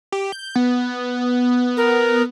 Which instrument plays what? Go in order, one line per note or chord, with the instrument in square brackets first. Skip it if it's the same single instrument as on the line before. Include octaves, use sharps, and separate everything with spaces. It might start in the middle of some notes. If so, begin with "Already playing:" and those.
[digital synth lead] G4
G6
B3
[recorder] A#4